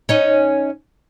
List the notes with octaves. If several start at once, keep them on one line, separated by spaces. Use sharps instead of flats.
C#4 D#4 D#5